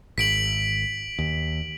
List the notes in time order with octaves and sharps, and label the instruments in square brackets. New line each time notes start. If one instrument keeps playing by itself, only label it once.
[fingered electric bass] G#1 [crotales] B6 D7 F#7
[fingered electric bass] D#2